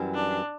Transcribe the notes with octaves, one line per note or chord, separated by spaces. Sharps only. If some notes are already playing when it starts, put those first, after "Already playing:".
Already playing: F#2 E3 G3
D4